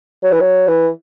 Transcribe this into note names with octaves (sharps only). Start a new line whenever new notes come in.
F#3
E3
F#3
E3